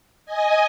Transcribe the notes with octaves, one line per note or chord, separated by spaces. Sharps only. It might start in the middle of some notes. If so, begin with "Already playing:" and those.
D#5 G#5